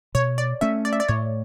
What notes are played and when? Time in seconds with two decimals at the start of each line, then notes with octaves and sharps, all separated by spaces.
0.15 B2 C#5
0.38 D5
0.61 A3 C#4 E5
0.85 D5
0.93 E5
1.00 D5
1.09 A2 C#5